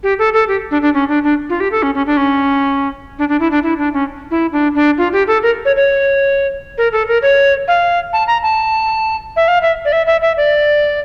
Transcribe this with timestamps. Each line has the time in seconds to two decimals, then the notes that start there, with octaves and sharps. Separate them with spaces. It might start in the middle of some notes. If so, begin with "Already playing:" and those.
0.03 G4
0.19 A4
0.34 A4
0.48 G4
0.71 D4
0.82 D4
0.94 C#4
1.09 D4
1.24 D4
1.49 F4
1.60 G4
1.72 A4
1.83 C#4
1.95 C#4
2.06 D4
2.17 C#4
3.19 D4
3.29 D4
3.40 E4
3.51 D4
3.63 E4
3.78 D4
3.93 C#4
4.31 E4
4.52 D4
4.75 D4
4.98 F4
5.13 G4
5.27 A4
5.43 A#4
5.65 C#5
5.76 C#5
6.78 A#4
6.92 A4
7.08 A#4
7.22 C#5
7.68 F5
8.13 A5
8.27 A#5
8.43 A5
9.36 E5
9.48 F5
9.62 E5
9.85 D5
9.92 E5
10.07 E5
10.22 E5
10.37 D5